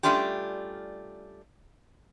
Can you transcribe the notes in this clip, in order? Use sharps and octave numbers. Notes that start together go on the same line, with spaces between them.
G3 A3 C#4 D4 F4 G4